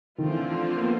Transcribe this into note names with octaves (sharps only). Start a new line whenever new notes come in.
D3 D#3 F3 A3 C4 F4
E3
A#3
B3